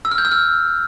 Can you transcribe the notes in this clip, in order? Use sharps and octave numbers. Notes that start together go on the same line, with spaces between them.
E6
F6
G6
E6
F6